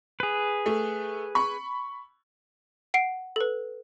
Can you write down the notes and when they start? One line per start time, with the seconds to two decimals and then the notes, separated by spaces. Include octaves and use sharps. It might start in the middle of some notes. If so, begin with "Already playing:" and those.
0.20 G#4 B4
0.66 A3
1.35 B5 C#6
2.94 F#5 C7 D7
3.36 A4 B4